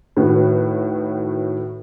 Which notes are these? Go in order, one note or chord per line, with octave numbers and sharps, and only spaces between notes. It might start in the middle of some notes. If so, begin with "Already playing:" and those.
A2 D#3 F#4 B4